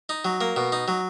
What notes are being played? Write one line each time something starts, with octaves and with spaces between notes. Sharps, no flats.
D#4
F#3
A#3
B2
D#4
F#3